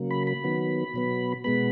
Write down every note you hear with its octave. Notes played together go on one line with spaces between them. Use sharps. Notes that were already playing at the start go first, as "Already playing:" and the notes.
Already playing: C#3 F#3 A#3
B5
B5
D#3 F#3 B3
B2 F#3 B3
B2 G#3 B3 B5